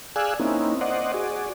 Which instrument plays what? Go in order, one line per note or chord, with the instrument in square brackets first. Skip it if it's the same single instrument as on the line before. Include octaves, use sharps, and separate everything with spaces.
[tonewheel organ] G#4 D5 F5 G#5 E6 F#6
A#3 C4 C#4 D#4 E4
C5 D5 D#5 F#5
F#4 G#4 D5